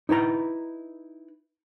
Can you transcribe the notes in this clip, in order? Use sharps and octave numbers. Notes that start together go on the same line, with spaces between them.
D#4 E4 B4 A#5